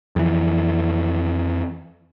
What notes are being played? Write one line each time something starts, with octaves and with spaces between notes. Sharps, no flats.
F2 E3